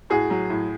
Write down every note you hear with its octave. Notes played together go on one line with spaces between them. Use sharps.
A2 F#4 G#4
F#3
A2